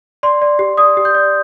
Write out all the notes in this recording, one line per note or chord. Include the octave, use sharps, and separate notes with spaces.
D5 C6
D5
G4
D5 D#6
G4
G6
D5